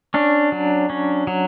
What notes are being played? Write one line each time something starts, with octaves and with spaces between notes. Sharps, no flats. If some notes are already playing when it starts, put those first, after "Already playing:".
C#4 D4
F#3
C#4
F#3